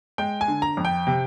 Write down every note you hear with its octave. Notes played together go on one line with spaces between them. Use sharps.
G#3 G5
G#5
D3
A#5
F2
G5
C3